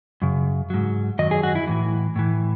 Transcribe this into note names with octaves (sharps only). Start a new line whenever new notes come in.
F#2 C#3
G#2 F#3
F#2 D#3 F#3 D#5
G#4
F#4
E4
A2 E3
A2 E3